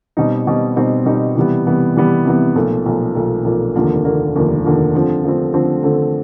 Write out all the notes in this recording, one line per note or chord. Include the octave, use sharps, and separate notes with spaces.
B2 G3 C4 D#4
B2 G3 C4 D#4
B2 G3 C4 D#4
B2 G3 C4 D#4
C3 E3 G3 B3
C3 E3 G3 B3
C3 E3 G3 B3
C3 E3 G3 B3
B1 A#2 F3 A3
B1 A#2 F3 A3
B1 A#2 F3 A3
B1 A#2 F3 A3
F1 D#2 D3 F3 A#3
F1 D#2 D3 F3 A#3
F1 D#2 D3 F3 A#3
F1 D#2 D3 F3 A#3
D3 F3 A3 C4
D3 F3 A3 C4
D3 F3 A3 C4
D3 F3 A3 C4